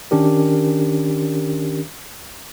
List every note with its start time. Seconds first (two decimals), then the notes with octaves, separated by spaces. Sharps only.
0.11 D#3 C#4 D4 G4 A#4